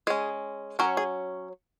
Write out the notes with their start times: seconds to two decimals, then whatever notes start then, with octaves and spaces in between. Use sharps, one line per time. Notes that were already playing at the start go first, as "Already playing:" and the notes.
0.07 G#3 C#4 G#4
0.79 F#3 C#4 A#4
0.97 G#4